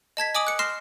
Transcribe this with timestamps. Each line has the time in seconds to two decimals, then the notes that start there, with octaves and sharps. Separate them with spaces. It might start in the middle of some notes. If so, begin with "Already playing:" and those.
0.17 D#5 A5 G#6 B6
0.34 D#5 G#5 D6 D#6 D7 F#7
0.47 F#6 C#7
0.59 C6 F6 A#6 C7 E7